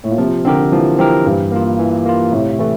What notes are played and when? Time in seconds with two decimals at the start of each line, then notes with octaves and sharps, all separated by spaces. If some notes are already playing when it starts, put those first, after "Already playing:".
0.04 A2
0.11 A#2
0.18 C3 F3
0.45 D3 C4 G4 A#4
0.72 E3 F3
0.98 E3 C4 G4 A#4
1.26 G2 E3
1.52 A#3 F4
1.79 E3
2.05 A#3 F4
2.32 A2 C3
2.59 E3 A3